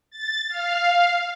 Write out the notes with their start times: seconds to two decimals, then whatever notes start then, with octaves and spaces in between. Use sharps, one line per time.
0.11 A6
0.49 F5